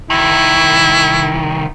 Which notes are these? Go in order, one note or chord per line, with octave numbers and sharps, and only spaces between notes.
C2 D#3 E4